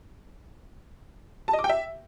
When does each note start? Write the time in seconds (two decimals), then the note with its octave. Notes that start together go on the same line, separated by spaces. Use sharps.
1.48 A5
1.53 D#5
1.59 D6
1.64 G5
1.70 E5